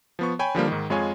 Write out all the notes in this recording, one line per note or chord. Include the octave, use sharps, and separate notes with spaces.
F3 B3 C#6
C#5 G5 G#5 B5
D3 F3 G3 A#3
G#2 D#3
F2 G#3 F4 C#5 G#5